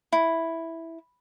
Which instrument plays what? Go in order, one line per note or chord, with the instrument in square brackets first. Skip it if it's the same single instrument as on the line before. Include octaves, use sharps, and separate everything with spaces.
[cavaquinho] E4